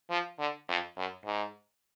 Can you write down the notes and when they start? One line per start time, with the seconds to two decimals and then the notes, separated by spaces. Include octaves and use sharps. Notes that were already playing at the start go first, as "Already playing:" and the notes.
0.10 F3
0.39 D3
0.68 F2
0.97 F#2
1.26 G#2